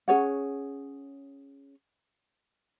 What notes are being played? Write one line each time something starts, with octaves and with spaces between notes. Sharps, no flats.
C#4 G#4 C#5 F#5